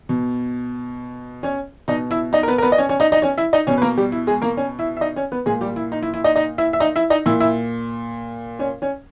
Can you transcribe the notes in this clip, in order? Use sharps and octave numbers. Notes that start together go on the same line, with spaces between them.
B2
C#4 C#5
B2 D#4 D#5
E4 E5
D#4 D#5
A#4
B3 B4
A#4
B3 B4
D#5
C#4 C#5
C#4 C#5
D#4 D#5
D#4 D#5
C#4 C#5
E4 E5
D#4 D#5
B2 C#4 C#5
B4
A#3 A#4
G3 G4
E4
G#3 G#4
A#3 A#4
C#4 C#5
E4 E5
E5
D#4 D#5
C#4 C#5
B3 B4
A#2 G#3 G#4
G3 G4
E4
D#4
E4
E4
D#4 D#5
D#4 D#5
E4 E5
E5
D#4 D#5
E4 E5
D#4 D#5
A#2 E4 E5
E4 E5
C#4 C#5
C#4 C#5